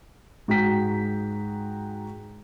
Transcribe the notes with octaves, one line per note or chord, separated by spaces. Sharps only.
G#2 F#4 G#4 G5 A#5 B6